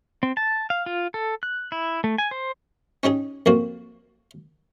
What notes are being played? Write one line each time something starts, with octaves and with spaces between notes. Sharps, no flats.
C4
A5
F5
F4
A4
F#6
E4
A3
G#5
C5
C#4 D#4 G4 G#4
F2 A#2 A#3 F#4